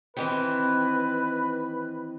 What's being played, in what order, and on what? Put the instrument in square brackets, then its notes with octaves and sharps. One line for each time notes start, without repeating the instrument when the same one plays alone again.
[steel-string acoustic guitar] D#3 E3 C4 [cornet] B4